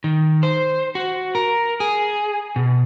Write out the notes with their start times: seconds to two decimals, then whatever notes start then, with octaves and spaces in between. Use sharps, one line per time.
0.04 D#3
0.43 C5
0.95 F#4
1.35 A#4
1.80 G#4
2.56 B2